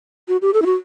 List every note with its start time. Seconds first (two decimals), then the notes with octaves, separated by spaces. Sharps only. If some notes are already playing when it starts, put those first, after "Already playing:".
0.28 F#4
0.42 G4
0.54 A4
0.62 E4
0.66 F#4